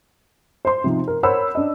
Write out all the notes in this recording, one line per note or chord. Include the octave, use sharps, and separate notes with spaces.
C5 C6
C3 F3 D#4
A#4
A#4 C5 C#5 F#5 B5 E6
D4 D#5